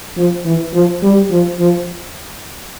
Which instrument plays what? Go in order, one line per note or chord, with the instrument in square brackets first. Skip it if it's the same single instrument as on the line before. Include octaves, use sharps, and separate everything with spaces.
[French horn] F3
E3
F3
G3
F3
F3